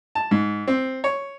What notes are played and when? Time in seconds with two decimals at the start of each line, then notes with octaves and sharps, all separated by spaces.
0.15 A5
0.31 G#2
0.68 C4
1.04 C#5